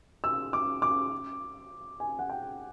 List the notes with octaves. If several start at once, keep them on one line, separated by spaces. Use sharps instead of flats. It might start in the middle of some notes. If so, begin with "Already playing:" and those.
E6
D6
D6
G#5
F#5
G5